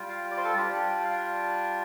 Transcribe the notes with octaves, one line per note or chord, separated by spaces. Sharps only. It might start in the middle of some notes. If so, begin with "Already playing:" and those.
Already playing: G3 F4
F5
D5
C5
A4
G3 D4 F4 G4
F5